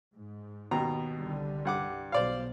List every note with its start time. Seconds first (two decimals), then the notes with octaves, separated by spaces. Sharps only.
0.13 G#2
0.71 D#2 B2 A#5
1.15 C2 D3 G3
1.65 G2 F#5 D6
2.12 B1 C5 D5 F5